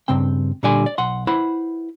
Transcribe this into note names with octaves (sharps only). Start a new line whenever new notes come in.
G2 C#3 C4 G5
A#2 D3 G3 D5 G#5
D5
B1 F#5 C6
E4 B4 C5 F#5 B5